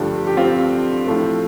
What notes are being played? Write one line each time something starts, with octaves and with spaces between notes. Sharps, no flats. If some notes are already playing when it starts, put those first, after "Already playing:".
Already playing: G2 D3 F3 A3 D4 G4
G4
C4 F4
A2 F3 A3